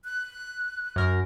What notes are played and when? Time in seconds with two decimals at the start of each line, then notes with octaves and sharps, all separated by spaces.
0.05 F#6
0.96 F#2 A#4